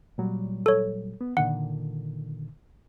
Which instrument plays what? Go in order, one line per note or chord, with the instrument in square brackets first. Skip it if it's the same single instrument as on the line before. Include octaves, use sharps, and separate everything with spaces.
[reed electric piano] A#2 F#3 G3
[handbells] A4 C#5
[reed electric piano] B3
[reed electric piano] A#2 D3 D#3 [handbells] F#5